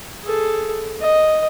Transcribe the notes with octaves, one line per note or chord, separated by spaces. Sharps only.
G#4 A4
D#5